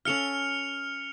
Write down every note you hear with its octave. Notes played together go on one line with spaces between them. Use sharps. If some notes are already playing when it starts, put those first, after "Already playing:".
C#4 A4 F5 F6 C#7 F7